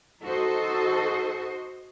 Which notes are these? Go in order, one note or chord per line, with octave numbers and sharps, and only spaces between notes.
D#4 F#4 A4 C5 D#5